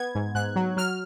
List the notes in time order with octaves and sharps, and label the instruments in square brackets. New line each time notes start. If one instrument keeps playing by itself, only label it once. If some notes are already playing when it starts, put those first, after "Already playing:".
Already playing: [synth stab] B3 G#6
G#2
G#2 F#6
F#3
F#3 F6